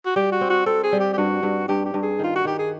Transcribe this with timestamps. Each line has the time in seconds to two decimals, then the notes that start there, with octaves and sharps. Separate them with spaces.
0.06 F#4
0.16 G3 G4
0.32 F#4
0.41 C4
0.50 F#4
0.66 C4 A4
0.83 G#4
0.92 G3
1.00 G4
1.13 G4
1.17 G2 F#4
1.43 G2
1.68 G2 G4
1.86 G4
1.94 G2
2.03 G#4
2.19 D#3 F4
2.36 F#4
2.45 D#3 G4
2.59 G#4